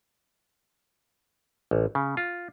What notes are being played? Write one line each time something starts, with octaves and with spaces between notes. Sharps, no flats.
A1
C#3
F4